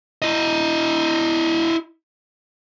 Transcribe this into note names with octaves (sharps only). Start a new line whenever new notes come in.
E4 D#5